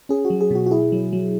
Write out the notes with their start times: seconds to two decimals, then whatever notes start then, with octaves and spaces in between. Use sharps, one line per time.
0.09 C#4 G#4
0.25 F#4
0.30 F#3
0.41 G#4
0.51 B2 F#4
0.66 F#4
0.71 E4 G#4
0.92 F#3
1.13 F#3